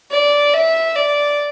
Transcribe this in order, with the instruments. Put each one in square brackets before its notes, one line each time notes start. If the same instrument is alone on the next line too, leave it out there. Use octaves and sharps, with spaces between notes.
[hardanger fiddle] D5
E5
D5